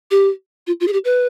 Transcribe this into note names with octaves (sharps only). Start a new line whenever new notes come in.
G4
F4
F4
G#4
G4
B4